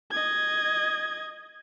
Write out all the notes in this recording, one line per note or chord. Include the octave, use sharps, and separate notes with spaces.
D#5 G#6